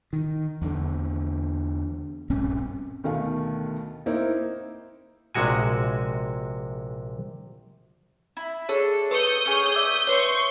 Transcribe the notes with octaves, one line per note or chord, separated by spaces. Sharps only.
D#3
E2 D3
A#1 G2 C4 C#4
D2 B2 D#3 A3 F5
A#3 C4 D#4 E4
A#1 C3 G#3 F#4 G#5
E4
D4 G#4 A4 C#5
B4 C#6 D#6 G6 C#7
C#4 G#4 C#5
D5 E5
B4 C#5 C6 C#6 G6